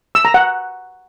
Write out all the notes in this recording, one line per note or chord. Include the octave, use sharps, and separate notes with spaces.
E6
A#5
F#5